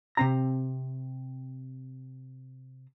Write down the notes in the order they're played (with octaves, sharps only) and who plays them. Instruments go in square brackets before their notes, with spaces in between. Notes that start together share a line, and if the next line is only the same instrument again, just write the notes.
[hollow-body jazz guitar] C3 C4 A#5